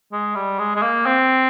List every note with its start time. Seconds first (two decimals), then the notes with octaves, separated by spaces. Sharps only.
0.12 G#3
0.35 G3
0.59 G#3
0.76 G#3
0.82 A#3
1.06 C4